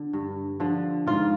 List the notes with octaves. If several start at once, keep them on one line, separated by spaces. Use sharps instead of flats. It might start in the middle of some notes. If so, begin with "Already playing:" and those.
Already playing: D3
G2
D3 F3
G#2 F4